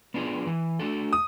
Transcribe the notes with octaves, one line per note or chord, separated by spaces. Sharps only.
B3 D4 F4 G#4
E3
A3 D4 F#4 A4
D#6